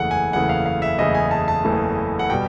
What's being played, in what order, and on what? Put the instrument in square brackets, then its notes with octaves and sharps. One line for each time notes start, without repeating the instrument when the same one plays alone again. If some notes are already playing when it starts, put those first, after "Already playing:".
Already playing: [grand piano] F#1 E2 C#3 E3 A3 F#5
G#5
F#1 E2 C#3 E3 A3 F#5
F5
F5
E5
F#1 E2 C#3 E3 A3 D#5
G#5
A5
A5
F#1 E2 C#3 E3 A3
F#5
B2 G3 G5